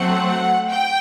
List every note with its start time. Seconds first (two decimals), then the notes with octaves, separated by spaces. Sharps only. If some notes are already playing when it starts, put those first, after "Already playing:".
Already playing: F#3 A3 C4 F#5
0.70 G5